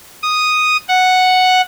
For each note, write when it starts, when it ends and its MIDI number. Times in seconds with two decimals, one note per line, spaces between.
0.23 0.77 87
0.89 1.61 78